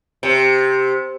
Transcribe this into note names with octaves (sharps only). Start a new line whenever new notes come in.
C3